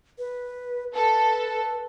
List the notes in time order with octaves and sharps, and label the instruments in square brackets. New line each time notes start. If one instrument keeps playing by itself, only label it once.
[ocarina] B4
[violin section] A4 [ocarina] B4